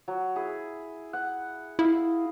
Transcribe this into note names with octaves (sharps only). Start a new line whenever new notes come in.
F#3
E4 G#4
F#5
E4 D5 D#5 F5